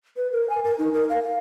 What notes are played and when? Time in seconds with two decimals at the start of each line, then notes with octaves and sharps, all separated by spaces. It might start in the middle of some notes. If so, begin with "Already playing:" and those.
0.17 B4
0.32 A#4
0.50 G#5
0.64 A#4
0.79 D#4
0.93 A#4
1.10 F5
1.23 F5